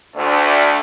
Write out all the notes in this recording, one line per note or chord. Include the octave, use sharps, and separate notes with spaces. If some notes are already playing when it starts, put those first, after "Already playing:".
D2